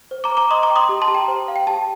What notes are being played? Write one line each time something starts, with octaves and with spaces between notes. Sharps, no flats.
C5
A#5 D6
C5
A#5 D6
D#5 C6 D#6
A#5 D6
G5
C6 D#6
G4
A5 C6
G4
G5 A#5
C5
F5
G5
G4 A5